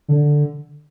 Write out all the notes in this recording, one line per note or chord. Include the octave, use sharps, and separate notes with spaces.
D3